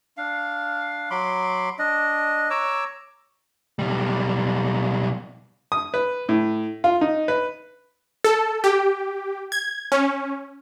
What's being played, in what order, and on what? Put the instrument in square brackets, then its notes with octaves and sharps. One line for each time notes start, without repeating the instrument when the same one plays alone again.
[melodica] D4 F5
F#3 B5 C6 D6
D4 D#5
C#5 A#5 D6 E6
[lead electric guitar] B1 G3
[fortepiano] D#6
B4
A2
F4
D#4
B4
[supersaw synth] A4
G4
G#6
C#4